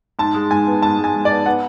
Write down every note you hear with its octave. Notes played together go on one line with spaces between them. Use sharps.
G#2 A5
G#3
G#2 G#5
B3
G#2 A5
G#3
G#5
G#2
B3 D5
B3 F#5